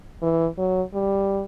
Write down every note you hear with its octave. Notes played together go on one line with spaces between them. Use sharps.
E3
F#3
G3